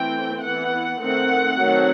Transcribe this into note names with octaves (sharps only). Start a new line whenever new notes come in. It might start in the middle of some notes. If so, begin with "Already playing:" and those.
Already playing: E3 A3 C4 G5
E3 B3 F#5
D#3 A3 C4 F#5
D#3 F#3 A3 C4